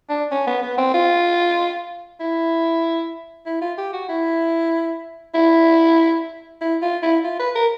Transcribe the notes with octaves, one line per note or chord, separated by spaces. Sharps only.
D4
C#4
B3
B3
C4
F4
E4
E4
F4
G4
F#4
E4
E4
E4
F4
E4
F4
B4
A#4